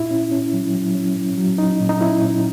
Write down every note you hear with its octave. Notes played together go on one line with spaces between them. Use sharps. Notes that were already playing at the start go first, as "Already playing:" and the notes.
Already playing: A#2 E4
C#4
C#4
F#3
F#3
C#4
C#4
F#3
C#4 D#4
A#2
D#4
C#4 E4
A#2